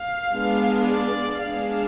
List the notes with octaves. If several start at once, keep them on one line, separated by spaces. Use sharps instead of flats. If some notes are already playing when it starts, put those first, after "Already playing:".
Already playing: F5
G#3 B3 D4
D5
G#3 B3 D4 F5